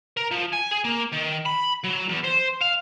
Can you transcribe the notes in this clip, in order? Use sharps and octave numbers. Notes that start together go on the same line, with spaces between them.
A#4
F3
G#5
G#4
A#3
D#3
B5
F#3
E2
C5
F5